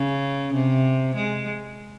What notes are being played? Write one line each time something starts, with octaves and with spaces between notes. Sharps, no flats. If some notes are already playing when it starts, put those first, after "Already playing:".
Already playing: C#3
C3
G#3